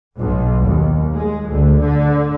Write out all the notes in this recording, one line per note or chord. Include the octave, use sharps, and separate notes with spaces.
B1
D#2
G#3
D2
D3